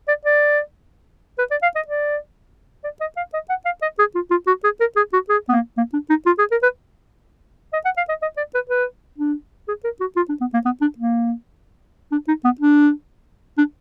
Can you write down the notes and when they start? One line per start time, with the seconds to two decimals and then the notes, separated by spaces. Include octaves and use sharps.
0.08 D5
0.25 D5
1.39 B4
1.51 D5
1.63 F5
1.76 D#5
1.88 D5
2.84 D5
3.01 D#5
3.17 F5
3.34 D#5
3.50 F#5
3.66 F5
3.82 D#5
3.99 G#4
4.15 F4
4.31 F4
4.47 F#4
4.64 G#4
4.81 A#4
4.96 G#4
5.13 F#4
5.29 G#4
5.49 B3
5.53 A#3
5.78 A#3
5.93 D4
6.09 D#4
6.26 F4
6.39 G#4
6.51 A#4
6.63 B4
7.73 D#5
7.85 F#5
7.97 F5
8.09 D#5
8.22 D#5
8.37 D5
8.55 B4
8.70 B4
9.18 D4
9.68 G#4
9.84 A#4
10.00 F#4
10.16 F4
10.29 D4
10.41 B3
10.54 A#3
10.65 B3
10.81 D4
10.98 A#3
12.12 D4
12.28 D#4
12.44 B3
12.61 D4
13.58 D4